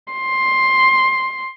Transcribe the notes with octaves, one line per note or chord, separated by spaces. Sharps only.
C6